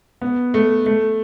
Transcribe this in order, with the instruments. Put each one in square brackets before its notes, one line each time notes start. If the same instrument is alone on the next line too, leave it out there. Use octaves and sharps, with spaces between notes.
[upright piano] B3
A3
A3